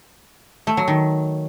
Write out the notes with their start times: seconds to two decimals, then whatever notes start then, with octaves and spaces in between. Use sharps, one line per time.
0.67 A3
0.77 F#3
0.88 D#3